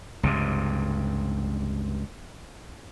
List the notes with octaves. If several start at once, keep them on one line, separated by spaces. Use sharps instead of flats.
C#2 G2 C3